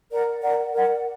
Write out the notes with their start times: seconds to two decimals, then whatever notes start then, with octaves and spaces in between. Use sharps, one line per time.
0.11 A#4 D5 F#5
0.42 A#4 D5 F#5
0.72 A#4 D5 F#5